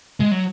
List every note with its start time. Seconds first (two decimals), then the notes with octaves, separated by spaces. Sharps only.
0.20 G#3
0.31 F#3